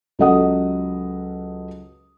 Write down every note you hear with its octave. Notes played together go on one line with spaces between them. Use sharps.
C#2 F#3 A4 D#5 F#5 D#6